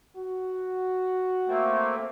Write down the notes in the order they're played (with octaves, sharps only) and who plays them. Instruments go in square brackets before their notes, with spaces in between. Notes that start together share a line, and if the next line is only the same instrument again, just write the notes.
[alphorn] F#4
[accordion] A3 A#3 C4